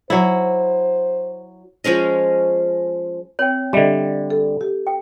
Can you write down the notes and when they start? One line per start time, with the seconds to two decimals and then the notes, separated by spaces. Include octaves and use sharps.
0.10 F#3 E4 C5
1.84 F3 G#3 C#4 D#5
3.39 C4 C#5 G5
3.73 D3 G3 D#5 E5
4.30 A4
4.61 G4
4.87 G5